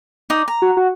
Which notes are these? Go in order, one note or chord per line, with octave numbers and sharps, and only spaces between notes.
D#4 D5 D#6
A#5
F#4
F#4